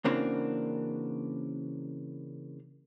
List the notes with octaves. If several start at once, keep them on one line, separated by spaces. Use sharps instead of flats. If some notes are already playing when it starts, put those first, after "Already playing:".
C#3 E3 A#3 C4 D4 F#4